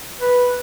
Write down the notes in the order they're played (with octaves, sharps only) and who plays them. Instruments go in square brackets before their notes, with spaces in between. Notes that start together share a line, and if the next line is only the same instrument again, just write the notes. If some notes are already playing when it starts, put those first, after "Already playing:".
[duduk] B4